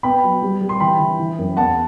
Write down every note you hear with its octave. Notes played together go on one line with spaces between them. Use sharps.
B3 G5 B5
F#3
G3
G3
C6
E3 G5 B5
E3
E3
F#2
E2 F#5 A5